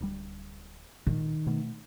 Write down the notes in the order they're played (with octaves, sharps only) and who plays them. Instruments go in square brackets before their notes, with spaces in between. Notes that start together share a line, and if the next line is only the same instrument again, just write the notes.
[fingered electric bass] D1 G3
[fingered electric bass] A#2 [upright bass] D#3
[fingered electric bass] B2 A3